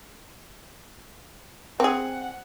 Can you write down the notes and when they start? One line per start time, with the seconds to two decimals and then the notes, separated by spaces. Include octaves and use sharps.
1.80 C4 G#4 F#5